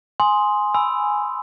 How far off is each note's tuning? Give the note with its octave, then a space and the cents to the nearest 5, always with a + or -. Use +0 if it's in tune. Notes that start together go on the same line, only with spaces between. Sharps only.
G#5 +5 C6 +0 D#6 +10
G#5 +0 B5 +15 E6 +0